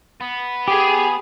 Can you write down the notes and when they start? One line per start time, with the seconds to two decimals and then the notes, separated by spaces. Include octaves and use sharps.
0.21 B3
0.68 G4 G#4